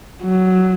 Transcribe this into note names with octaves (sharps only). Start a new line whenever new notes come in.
F#3